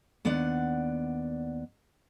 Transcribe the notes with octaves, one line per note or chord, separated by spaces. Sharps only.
D#2 B3 D4 D5 F#5